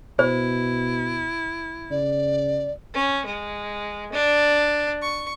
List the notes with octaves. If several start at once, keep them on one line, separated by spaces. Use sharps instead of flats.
B2 E4 C5
C#3 D5
C#4
G#3
D4
C#6